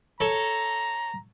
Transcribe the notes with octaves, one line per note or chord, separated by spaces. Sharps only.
A4 C#5 A#5